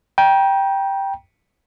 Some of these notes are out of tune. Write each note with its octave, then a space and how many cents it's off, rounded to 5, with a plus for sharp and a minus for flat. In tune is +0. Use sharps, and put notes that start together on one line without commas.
G5 +0 A#5 +40